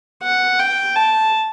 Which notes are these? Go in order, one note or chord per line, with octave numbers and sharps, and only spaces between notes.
F#5
G5
A5